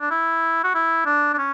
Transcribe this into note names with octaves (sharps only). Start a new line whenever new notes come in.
D4
E4
F#4
E4
D4
D4
C#4